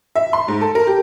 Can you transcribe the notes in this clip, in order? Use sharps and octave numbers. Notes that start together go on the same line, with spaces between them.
E5
C6
G#2
A4
A#4
G4